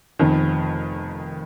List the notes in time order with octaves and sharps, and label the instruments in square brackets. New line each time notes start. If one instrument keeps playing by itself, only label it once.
[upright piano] F1 F2 D#3